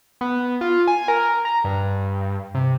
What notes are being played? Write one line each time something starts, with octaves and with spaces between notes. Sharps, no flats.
B3
F4
G#5
A#4
A#5
G2
C3